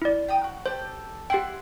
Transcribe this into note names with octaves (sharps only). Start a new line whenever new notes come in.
E4 D5
G5 A#5 D#6
F#4
G4 A4 C5
E4 G4 F#5 G5 C6